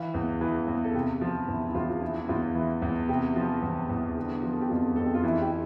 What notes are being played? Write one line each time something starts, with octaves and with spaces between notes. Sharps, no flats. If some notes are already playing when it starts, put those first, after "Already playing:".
Already playing: E3 F5
E2
E3
E2
A4
C3 G4
F3
E2 E4
E4
E2 F4
F4
E3 E4
E4
E2 F4
E3
E2
C3 G4
F3
E2
E2
D3
F3
A4
G4
F2 F4
F2 A4
G4
F4
E3 E4
G4